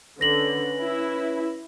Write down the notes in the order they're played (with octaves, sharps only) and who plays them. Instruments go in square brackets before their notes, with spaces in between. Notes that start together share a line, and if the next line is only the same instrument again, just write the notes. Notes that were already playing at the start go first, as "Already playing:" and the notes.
[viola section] D3 [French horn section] C#4 B4 [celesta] A#6 F#7
[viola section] E4